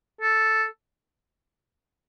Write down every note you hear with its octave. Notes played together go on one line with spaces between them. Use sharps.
A4